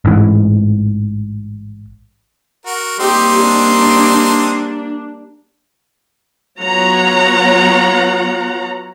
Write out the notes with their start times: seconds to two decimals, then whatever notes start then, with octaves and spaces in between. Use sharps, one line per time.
0.05 A1 G#2 E3
2.66 F#4 A#4
3.00 G3 A#3 C4 D#4 G4 C6
3.41 D4
6.60 F#3 B3 F4 C#5 F#5 A#5